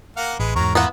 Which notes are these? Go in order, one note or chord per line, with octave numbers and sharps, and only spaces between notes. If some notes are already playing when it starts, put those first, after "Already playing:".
A#3 F5 F#5
A1 G#3 B4
E2 G#2 F#3 A#4 C#6
A#3 B3 E4 F4 F#5 A#5